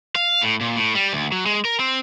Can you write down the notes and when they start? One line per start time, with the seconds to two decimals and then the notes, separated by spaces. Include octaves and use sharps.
0.16 F5
0.42 A2
0.61 A#2
0.77 A2
0.95 G3
1.13 D2
1.32 F#3
1.46 G#3
1.65 A#4
1.80 C4